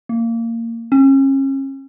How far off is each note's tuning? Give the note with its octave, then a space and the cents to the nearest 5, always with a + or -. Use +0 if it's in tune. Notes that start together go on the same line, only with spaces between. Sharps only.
A#3 -20
C#4 -35